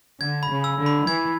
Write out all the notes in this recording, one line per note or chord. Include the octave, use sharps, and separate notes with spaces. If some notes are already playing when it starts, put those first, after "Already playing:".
D3 G#6
B5
C#3
E6
D3
B5
E3 G#6